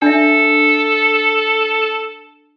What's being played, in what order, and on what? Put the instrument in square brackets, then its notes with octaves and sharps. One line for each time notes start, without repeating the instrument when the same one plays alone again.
[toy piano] D4 E5 [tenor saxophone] A4